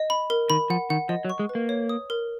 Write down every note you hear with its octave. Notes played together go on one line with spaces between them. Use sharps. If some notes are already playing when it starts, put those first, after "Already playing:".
Already playing: D#5
B5
A#4
D#3 B5
F3 F#5
D#3 F#5
F3 D#5
F#3
C#6
G#3
B4
A#3
C#5
D#6
A#4